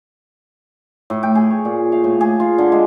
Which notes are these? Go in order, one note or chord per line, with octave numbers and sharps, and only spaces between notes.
A2
G5
G#4
C#5
A#2
F5
A2
G#4
F4
D3
G#3